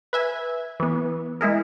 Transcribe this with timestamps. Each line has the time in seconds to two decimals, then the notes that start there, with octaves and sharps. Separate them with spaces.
0.13 B4 E5 G#5
0.80 E3 B3
1.41 G#3 E4 G#4 A#4